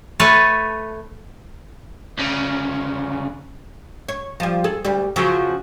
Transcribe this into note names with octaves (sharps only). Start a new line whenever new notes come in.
A3 A4 B4 C#5 G#5 A5
D2 C#3
C#5
F3 G3
G#4 A4
D2 G3
C#3 F3 F#3